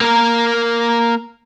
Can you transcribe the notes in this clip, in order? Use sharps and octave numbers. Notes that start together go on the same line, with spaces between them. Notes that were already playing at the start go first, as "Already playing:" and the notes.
A#3 A#4